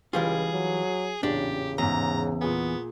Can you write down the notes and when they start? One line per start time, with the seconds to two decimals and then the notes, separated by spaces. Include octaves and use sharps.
0.13 C#2 E3 G3 F4 G#4
0.53 F#3
1.23 A1 E2 A#2 C#3 D4 G4
1.78 A1 E2 G#2 A#5
2.41 A#2 B3 G#4 G#5